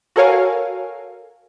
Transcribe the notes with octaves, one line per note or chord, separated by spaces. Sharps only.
F#4 A4 A#4 C#5 F5 G#5